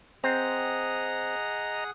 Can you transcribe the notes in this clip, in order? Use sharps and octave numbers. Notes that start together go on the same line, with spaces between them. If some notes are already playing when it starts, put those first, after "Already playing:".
C4 G#4 D#5 F#5 A#5 D#6